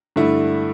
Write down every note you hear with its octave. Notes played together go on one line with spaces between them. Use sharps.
G2 D3 A3 E4